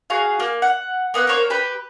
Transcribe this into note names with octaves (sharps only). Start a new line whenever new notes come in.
F#4 G#4 F5
A#3
F#5
A#3 B3 F#5 F#6
A#3 A#4 C5 C#5
G4 B4 G5